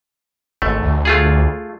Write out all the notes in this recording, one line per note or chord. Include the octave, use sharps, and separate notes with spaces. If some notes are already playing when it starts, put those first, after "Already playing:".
G#1 A3
D2
A3 F4 G#4